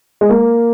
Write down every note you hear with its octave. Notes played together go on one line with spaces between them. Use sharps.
G#3
A#3